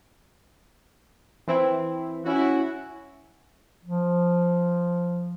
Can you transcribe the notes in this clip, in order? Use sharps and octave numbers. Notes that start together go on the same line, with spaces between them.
E3 C4 E4
C#4 E4 F#4
F3